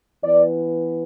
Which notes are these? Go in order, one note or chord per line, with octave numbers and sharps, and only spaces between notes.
E3 B3 D5